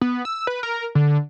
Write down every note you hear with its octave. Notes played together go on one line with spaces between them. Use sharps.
B3
E6
B4
A#4
D3